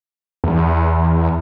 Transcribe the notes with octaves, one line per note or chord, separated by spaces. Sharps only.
E2